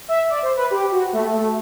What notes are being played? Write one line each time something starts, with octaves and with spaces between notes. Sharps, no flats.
E5
D5
C5
B4
G4
F#4
A3
A3